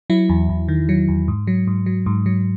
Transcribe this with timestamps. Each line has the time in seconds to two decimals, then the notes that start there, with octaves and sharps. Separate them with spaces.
0.10 F#3 E4
0.29 E2
0.49 E2
0.68 D#3
0.89 F#3
1.08 E2
1.28 G#2
1.47 F#3
1.67 G#2
1.86 F#3
2.06 G#2
2.26 F#3